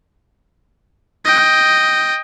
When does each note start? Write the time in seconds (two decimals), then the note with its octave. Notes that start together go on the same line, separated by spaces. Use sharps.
1.25 D#5 G5